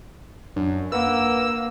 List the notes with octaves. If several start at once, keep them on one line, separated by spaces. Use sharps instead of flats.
F#2 D4
A#3 B4 F#5 E6